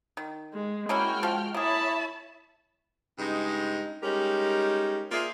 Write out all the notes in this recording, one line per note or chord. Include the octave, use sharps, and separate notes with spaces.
D#3
G#3
G#3 A#3 C#4 E4 F#4 G5 F6
F3
A#3 E4 G#4 C#5 E5 A5 B5
G2 C#3 G#3 D#4
G3 G#3 C#4 D#4 G4 A#4
A#3 F4 G#4 C5 D5 E5